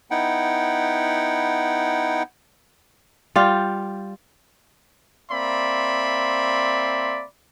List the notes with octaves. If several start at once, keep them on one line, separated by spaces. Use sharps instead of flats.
B3 D#4 E4 F#5 G5
G3 F4 G4
A#3 C4 D5 E5 B5 C6